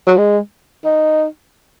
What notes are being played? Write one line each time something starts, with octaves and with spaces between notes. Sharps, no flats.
F#3
G#3
D#4